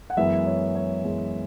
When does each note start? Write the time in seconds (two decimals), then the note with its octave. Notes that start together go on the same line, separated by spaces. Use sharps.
0.10 F#5
0.17 F#2 E3 G#3 B3 E5
0.47 C#5
0.75 C#5
1.04 F#2 E3 G#3 B3